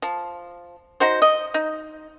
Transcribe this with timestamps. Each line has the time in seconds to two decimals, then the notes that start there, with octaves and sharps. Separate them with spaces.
0.02 F3
1.00 D#4 F#4 C5
1.22 D#5
1.54 D#4